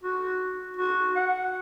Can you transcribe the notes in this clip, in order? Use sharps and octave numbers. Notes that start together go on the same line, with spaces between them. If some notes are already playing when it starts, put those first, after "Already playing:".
F#4
F#4
F#5